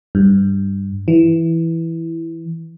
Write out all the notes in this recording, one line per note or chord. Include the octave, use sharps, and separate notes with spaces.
G2
E3